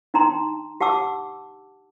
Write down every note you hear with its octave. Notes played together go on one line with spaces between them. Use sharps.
D4 D#4 G5 A#5 C6
G4 F#5 A5 D6 E6